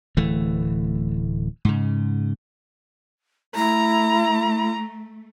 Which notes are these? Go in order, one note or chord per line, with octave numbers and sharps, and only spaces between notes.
D1 E3 A3
G#2 C#3
A3 E4 A#5